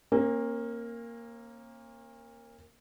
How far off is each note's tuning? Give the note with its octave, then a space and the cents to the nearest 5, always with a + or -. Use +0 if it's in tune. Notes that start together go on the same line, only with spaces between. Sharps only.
A#3 +0 C#4 -45